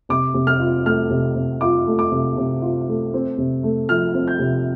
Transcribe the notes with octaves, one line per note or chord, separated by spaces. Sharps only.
C3 D6
C3
F6
F4
A3 F6
C3
C3
F4 D6
A3
D6
C3
C3
F4
A3
C4
C3
A3
F3 F6
C4
G6
C3